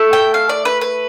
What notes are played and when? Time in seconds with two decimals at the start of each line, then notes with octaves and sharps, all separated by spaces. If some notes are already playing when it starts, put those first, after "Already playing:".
Already playing: A3 E4 A4
0.13 G5
0.34 F5
0.49 D5
0.65 B4
0.81 B4